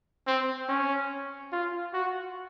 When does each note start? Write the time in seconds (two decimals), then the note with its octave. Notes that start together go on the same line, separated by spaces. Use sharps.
0.27 C4
0.69 C#4
1.53 F4
1.94 F#4